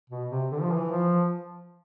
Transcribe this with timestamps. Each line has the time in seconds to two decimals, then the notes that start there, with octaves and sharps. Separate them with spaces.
0.10 B2
0.30 C3
0.51 D3
0.62 F3
0.72 E3
0.92 F3